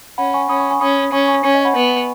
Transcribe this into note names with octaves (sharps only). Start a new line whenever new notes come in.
C#4 F#5 B5
G#5 C#6
C#4 B5 D#6
G#5 C#6
G#5 C#6
C#4 B5 D#6
C#4 G#5 C#6
G#5 C#6
C#4 G#5 C#6
D#5 G#5
F#5 B5
B3